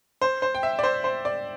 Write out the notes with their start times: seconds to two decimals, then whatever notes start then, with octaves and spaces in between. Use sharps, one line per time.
0.22 C5
0.42 C5
0.55 G5
0.63 E5
0.79 D5
0.83 C5
1.04 C5
1.25 D5